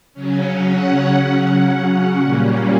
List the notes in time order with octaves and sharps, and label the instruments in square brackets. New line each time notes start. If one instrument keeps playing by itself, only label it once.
[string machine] C#3 F#3 C#4
F#5
A#2 G3 A#3 C#4